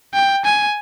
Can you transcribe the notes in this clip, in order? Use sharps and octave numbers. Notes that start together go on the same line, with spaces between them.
G5
G#5